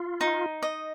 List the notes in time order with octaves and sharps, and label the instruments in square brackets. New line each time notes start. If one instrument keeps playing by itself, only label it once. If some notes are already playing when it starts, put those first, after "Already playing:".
Already playing: [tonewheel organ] F4
[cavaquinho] D#4
D#5